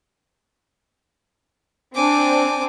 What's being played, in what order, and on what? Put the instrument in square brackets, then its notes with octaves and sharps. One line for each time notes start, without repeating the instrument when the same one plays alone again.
[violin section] C4 D4 [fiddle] G#5 D6